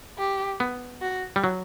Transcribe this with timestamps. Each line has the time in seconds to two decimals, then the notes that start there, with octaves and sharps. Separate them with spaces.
0.19 G4
0.60 B3
1.02 F#4
1.36 G3
1.44 F#3